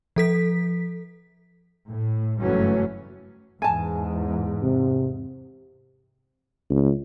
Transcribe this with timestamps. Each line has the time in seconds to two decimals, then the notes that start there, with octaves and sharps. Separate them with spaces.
0.16 F3 A4 B6
1.89 A2
2.40 F#1 G2 E3 F#3 A3 C#4
3.62 E2 G#2 G#5 A5
4.63 C3
6.70 C#2